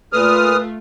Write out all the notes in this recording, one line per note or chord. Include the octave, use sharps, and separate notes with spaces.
A#2 A3 F4 B4 D#6 F6